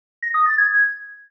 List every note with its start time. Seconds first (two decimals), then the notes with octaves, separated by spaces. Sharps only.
0.22 A#6
0.34 D#6
0.46 A6
0.58 G#6